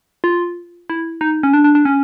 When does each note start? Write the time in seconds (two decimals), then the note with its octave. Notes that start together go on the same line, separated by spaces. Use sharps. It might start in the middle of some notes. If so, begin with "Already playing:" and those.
0.24 F4
0.90 E4
1.21 D#4
1.43 C#4
1.53 D4
1.64 D4
1.75 D4
1.85 C#4